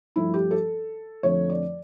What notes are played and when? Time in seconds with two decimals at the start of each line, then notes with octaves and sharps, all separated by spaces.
0.16 G2 F3 A3 E4
0.34 G4
0.51 A4
1.23 F2 D3 F3 A3 C#5
1.50 D5